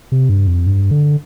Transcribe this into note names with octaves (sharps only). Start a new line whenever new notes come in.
C3
G2
F2
G2
D3